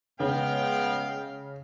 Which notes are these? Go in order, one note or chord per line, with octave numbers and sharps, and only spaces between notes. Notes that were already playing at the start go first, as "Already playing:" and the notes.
C#3 G#3 B3 F5 G5